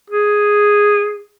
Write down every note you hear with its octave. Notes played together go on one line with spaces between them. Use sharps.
G#4